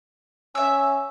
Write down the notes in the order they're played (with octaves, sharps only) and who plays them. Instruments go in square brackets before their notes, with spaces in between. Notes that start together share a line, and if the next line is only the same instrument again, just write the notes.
[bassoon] C#4 [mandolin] E5 E6